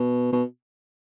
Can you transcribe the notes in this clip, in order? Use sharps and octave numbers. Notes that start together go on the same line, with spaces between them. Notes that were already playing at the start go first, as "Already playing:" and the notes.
Already playing: B2
B2